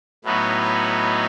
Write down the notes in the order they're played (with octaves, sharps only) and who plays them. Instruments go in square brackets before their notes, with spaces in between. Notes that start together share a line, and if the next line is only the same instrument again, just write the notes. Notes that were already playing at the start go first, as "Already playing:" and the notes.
[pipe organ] A2 F#3 B3 D#4 F#4